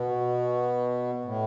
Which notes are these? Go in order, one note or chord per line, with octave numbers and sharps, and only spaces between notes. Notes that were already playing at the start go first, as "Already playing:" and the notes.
Already playing: B2
A2